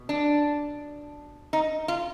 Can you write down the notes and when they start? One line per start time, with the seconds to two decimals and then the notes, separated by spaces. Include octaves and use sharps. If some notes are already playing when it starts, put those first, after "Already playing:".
Already playing: B2
0.09 D4
1.53 D#4
1.88 F4